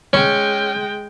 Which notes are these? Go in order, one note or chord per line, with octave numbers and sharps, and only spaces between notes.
G#3 C#4 G5 C#6